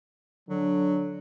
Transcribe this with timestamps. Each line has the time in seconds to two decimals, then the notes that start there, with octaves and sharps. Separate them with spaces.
0.49 D3 F#3